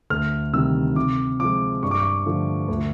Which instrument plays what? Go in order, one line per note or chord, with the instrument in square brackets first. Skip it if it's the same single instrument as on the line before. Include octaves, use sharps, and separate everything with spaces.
[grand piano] D2 F6
C3 D#3 G3 E6
C3 D6
F3 G#3 D6
G2 C#6
D6
C#6
D3 F3 A3
D2